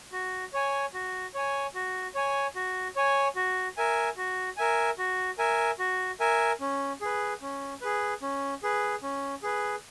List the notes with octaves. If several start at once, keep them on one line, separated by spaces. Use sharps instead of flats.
F#4
C#5 G#5
F#4
C#5 G#5
F#4
C#5 G#5
F#4
C#5 G#5
F#4
A#4 E5 G#5
F#4
A#4 E5 G#5
F#4
A#4 E5 G#5
F#4
A#4 E5 G#5
C#4
G#4 B4
C#4
G#4 B4
C#4
G#4 B4
C#4
G#4 B4